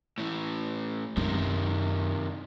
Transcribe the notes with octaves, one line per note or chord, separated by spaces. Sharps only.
A2 E3
F#2 C3 D#3